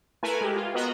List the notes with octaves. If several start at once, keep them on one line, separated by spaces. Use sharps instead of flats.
A3 E4 A#4 B4 G#5
G#3 G4
F4
B3 F#4 A#4 D#5 A#5 B5